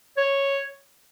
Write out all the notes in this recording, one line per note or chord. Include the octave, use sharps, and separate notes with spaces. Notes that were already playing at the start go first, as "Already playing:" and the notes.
C#5